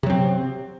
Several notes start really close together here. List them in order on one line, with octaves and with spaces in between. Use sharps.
C3 F#3 C4